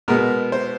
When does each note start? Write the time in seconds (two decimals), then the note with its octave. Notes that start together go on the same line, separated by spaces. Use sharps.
0.08 B2 G#3 B3 A#4
0.52 C5